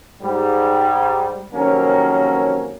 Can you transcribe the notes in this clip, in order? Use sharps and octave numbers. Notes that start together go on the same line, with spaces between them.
G#2 G3
F2 C3 D#3 F#3 A#3 C#4